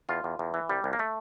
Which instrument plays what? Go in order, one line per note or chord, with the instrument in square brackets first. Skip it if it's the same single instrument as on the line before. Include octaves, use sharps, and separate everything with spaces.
[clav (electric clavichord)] E2 F4
E2
E2
E3
C2 G3
C2
A#3
A3